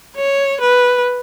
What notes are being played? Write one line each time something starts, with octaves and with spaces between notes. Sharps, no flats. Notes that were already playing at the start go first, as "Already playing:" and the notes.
C#5
B4